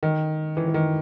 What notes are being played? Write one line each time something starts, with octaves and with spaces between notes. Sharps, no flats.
D#3
E3
E3
D#3